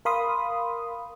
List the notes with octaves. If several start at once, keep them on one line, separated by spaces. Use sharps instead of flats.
A#4 F5 B5 C6 D#6